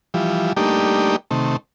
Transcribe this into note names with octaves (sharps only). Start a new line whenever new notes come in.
E3 F3 G3
G3 A3 A#3 D4 D#4 G4
C3 D#3 A3